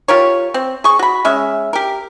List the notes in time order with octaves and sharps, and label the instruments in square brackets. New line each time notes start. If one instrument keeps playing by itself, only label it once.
[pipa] F4 G4 A#4 C#5
C4
G#4 C#6
F#4 B5
G#3 C#4 E5
G4 A#4